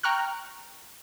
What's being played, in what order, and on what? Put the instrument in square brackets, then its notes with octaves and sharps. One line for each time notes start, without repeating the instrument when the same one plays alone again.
[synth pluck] G5 A#5 C#6 F6 F#6